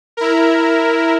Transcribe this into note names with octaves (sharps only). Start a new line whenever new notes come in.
E4 A#4